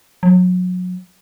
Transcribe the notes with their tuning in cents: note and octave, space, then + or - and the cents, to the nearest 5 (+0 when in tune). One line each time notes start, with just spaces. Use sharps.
F#3 -30